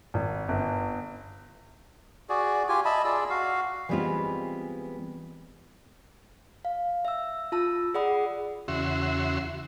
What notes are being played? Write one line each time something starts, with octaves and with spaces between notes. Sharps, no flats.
G#1
G1
F#4 G#4 D5
F4 G4 G#5
D#5 E5 A5 B5
F4 G#4 D5 E6
F#4 F5
E3 G3 G#3 B3 C4 F4
F5
E5 E6
F4 A5 E6
G#4 D5 F#5 B5 D#6
E2 C#3 F#4 E5 C6